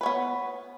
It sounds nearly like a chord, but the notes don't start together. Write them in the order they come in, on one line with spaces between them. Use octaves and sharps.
B4 C#5 B3